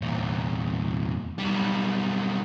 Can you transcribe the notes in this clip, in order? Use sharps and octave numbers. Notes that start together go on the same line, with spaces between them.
E2 A#2
B1 G3